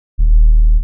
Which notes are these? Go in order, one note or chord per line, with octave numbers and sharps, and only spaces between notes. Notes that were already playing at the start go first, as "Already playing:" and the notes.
D#1